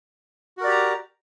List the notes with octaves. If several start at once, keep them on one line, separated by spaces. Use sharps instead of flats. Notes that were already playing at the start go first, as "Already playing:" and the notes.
F#4 G4 A#4 D5 A#5